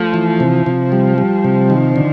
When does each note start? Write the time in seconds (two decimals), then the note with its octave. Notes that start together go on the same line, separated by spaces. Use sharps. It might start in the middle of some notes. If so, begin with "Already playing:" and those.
Already playing: F3 A3
0.14 E3
0.40 C3
0.66 C3
0.92 G3
1.18 G3
1.44 C3
1.70 D#3
1.96 D3